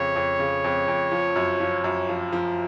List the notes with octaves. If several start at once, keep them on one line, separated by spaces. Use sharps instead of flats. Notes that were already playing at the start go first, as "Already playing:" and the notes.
Already playing: F2 C#3 C#5
F2
C#3
F2
F2
F3
F#2
F3
F#2
F3
F3